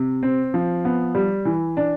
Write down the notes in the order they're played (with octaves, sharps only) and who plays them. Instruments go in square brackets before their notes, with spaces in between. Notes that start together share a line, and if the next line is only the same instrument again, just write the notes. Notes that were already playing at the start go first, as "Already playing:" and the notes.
Already playing: [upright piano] C3
C4
F3
B3
G3
E3
D4